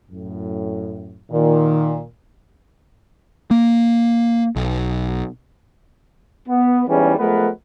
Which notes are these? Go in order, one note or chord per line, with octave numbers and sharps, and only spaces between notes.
F#2 A2
A#2 D#3
A#3
B1
B3
E2 G#2 E3 G3 C#4
F3 G#3 A3 B3 A#4 B4